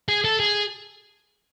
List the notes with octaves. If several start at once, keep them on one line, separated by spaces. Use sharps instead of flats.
G#4
A4
G#4